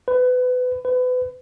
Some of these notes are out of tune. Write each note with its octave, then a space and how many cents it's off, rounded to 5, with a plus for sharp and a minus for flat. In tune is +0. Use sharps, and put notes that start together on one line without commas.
B4 +25
B4 +30